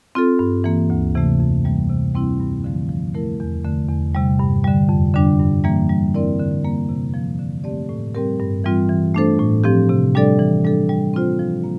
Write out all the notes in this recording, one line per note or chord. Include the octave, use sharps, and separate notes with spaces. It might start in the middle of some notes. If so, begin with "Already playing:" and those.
C4 F4 A4
G2
E3 A#3
D2
C3 E3 A3
F2
E3 G3 A#3
C3
G3 C4 E4
G2
D3 F3 A3
F3
A3 E4 A#4
E2
D3 A3
E2
C3 G3
G2
D3 G3
F2
D3 G3 D4
G2
E3 G3 A#3
G3
C4 E4 A#4 D5
D3
G3 A#3
C3
F3 A#3
D3
A3 C4 G4 D5
A2
G3 C4 G4 A#4
G2
E3 G3 C4 F4
E3
A3 D4 A4 C5
A2
F3 C4 G4
C3
G3 D4 A4 D5
E3
G3 D4 A4
G3
C4 F4 C5
F3
A#3